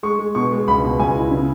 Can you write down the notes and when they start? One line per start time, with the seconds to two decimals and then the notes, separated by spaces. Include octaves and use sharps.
0.03 G#3 C#6
0.19 G#3
0.35 B2 C#6
0.52 G#3
0.68 C#2 B5
0.84 B2
0.99 C#2 G#5
1.16 E4
1.31 C#3